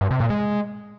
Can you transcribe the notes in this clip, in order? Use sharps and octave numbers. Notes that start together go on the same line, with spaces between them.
G2
C3
A#2
G#3